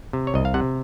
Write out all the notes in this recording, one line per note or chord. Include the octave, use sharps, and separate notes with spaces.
C3
C#5
C2 D#5
F5
C3 F#5